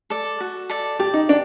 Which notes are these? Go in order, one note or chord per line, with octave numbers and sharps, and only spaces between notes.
A4 D5
F#4
A4 D5
G4 D5
D#4
D4 G5